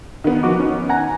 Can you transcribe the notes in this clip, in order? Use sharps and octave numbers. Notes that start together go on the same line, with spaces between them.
D#3 B3
F3 F#4 D6
C#4
F#5 G#5 A#5